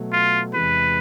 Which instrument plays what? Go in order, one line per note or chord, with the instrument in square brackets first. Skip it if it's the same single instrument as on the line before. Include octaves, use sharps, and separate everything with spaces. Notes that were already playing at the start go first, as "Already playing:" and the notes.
Already playing: [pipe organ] B2 F#3 A3
[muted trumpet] F4
[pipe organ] E2 C3 E3 G#3 [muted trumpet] B4